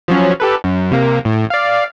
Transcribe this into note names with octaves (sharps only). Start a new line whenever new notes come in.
F3 F#3 C#4
G4 A4 B4
F#2
C3 A#3
A2
D5 F5